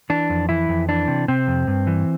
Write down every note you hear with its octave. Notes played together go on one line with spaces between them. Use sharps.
E3 D4
F2
E3 E4
F2
E3 D4
C3
C3 C4
F2
G2
E3